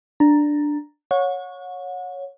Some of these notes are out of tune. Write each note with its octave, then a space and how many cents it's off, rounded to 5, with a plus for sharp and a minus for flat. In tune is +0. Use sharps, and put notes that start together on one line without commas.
D4 +5 A#5 +0
C#5 +0 F#5 -35